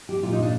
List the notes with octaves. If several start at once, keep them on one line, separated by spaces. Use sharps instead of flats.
G4
A#2 F4
D#4
D4